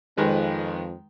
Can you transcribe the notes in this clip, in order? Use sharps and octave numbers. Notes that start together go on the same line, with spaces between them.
F2 D#3 G#3 B4